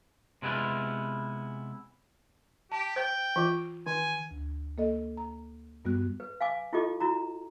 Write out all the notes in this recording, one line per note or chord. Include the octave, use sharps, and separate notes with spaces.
C3 G#3 B3 E4 F4
G4 A5
C5 G5
E3 F4
D#3 G#5
D2
A#3 A4 D#5
A#5
G2 G3 B3 F#4 F#6
B4
F5 G#5 D6
E4 F4 G4 A4 D#5 D6
E4 F#4 A#5